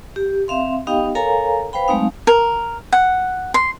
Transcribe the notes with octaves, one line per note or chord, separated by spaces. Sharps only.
G4
C4 E5 F5 C6
B3 D#4 G4 D#5 F5 G5
A4 A#4 C#5 F5 G#5 A#5
B4 C5 F5 G5 B5
F#3 G#3 A3 C4 D#4 F5
A#4
F#5
C6